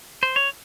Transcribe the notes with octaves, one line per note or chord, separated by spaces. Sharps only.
C5
C#5